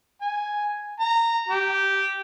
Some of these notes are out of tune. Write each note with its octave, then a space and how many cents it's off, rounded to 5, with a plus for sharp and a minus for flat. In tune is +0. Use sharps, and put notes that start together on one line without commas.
G#5 +0
A#5 -15
G4 -10